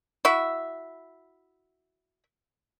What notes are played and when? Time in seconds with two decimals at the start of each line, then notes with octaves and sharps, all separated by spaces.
0.25 E4 F#4 E5